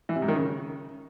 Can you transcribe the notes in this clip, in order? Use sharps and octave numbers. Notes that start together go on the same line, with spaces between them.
E3
C3
G#2
D#3
C#3